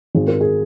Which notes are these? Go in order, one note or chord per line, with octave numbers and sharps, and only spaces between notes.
G#1 G#4
A#4
G#4